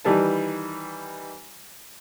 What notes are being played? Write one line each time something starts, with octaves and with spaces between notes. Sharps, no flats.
D#3 E3 G3 B4 A5